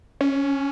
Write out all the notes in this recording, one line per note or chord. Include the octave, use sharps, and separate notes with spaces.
C#4